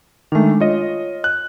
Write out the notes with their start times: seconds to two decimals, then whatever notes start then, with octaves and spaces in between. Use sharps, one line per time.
0.32 D#3 G#3 A3 D4
0.60 F4 C#5 D#5
1.24 F#6